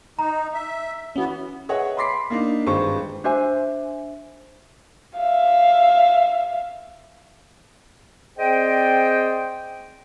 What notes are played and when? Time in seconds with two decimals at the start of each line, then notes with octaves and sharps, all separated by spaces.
0.19 D#4 A#5
0.53 E5
1.16 E3 B3 C#4 F#4
1.69 G#4 B4 C#5 D#5 E5 F#5
1.97 B5 C6 D6 B6 C7
2.30 A#3 D4 D#4
2.66 G#1 G2 G#3 F4 C5 C#6
3.24 D4 C5 E5 G#5
5.17 E5 F5
8.38 C4 G#4 C5 D5 D#5 G5